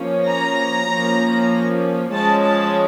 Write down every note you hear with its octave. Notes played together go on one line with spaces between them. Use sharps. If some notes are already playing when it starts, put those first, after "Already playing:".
Already playing: F3 A#3 C#4
A#5
F3 A#3 C#4
F3 G#3 C#4 A5
A5